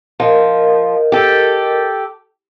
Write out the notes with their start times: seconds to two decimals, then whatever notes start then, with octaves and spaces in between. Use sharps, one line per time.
0.20 F3 A#4 D#5
1.12 G4 A4